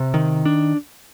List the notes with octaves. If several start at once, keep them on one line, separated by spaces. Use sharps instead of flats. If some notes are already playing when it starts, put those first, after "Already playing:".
Already playing: C3
D#3
D4